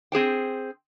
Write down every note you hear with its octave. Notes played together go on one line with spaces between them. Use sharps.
C4 G#4 C5 G5